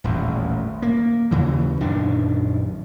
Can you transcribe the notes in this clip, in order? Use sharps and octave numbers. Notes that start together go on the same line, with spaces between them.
D#1 A1 E2
A#3
D#2 C#3 E3
A#1 F#2 D#3 D4